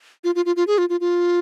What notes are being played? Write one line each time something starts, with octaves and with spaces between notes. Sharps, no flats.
F4
F4
F4
F4
G#4
F4
F4
F4